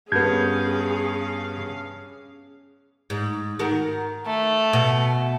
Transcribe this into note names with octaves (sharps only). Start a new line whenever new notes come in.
G2 B3 C#4 G#4 F5 G6 G#6
G#2
D#3 F#4 A#4
A3
B2